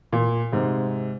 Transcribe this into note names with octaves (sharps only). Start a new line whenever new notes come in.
A#2
G#2 C3